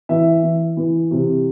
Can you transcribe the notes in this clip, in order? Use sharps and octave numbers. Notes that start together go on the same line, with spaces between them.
E3 E5
E3
E3
C3